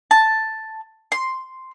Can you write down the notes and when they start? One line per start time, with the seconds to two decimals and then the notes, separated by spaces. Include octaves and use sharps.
0.11 A5
1.12 C6